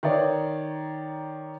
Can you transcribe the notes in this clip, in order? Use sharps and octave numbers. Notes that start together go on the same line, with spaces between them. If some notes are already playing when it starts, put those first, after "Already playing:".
D#3 D#4 C#5 D5